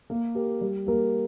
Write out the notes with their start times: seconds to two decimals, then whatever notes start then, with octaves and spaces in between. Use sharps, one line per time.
0.10 A#3
0.35 G4 A#4
0.61 G3
0.87 A#3 G4 A#4